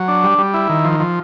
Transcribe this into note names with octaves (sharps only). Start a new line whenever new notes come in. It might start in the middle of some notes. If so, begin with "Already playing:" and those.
Already playing: F#3
D4
G3
G3
E4
D#3
F3
F3